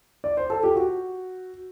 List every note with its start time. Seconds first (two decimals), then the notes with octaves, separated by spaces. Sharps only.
0.24 D5
0.37 C5
0.50 A4
0.63 G4
0.76 F#4